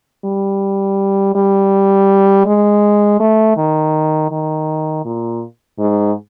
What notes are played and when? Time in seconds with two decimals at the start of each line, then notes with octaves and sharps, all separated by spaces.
0.25 G3
1.35 G3
2.45 G#3
3.20 A3
3.57 D#3
4.31 D#3
5.05 A#2
5.79 G#2